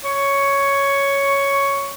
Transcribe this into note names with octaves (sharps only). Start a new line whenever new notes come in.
C#5 C#6